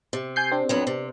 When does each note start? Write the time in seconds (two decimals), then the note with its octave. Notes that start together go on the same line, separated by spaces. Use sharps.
0.13 C3
0.36 G#5 G6 C7
0.51 C4 D4
0.69 F2 F#3 B3
0.87 C3